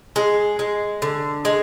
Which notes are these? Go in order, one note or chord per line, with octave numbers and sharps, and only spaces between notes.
G#3
G#3
D3
G#3